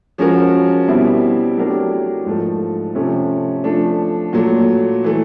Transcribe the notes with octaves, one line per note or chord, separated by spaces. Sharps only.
F3 G#3 C#4 F#4 A#4
B2 G3 C4 E4
F#3 A3 D4 G4 A#4
G#2 F3 A3
C3 F3 A3 C#4
F3 A3 D4
A#2 F#3 A3
E3 A3